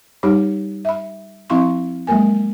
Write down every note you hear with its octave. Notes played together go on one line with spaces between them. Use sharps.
G3 D#4 G4 C#5 B5
E5 B5
F3 C4 E4 F5 C6 C#6
F#3 G#3 A#3 A#4 G#5